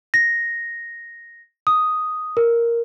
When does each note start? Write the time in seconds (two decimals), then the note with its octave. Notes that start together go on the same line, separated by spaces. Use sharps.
0.14 A#6
1.67 D#6
2.37 A#4